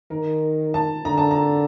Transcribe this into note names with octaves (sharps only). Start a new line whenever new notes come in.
D#3 A#4
A5
D3 A#5
A5
A#5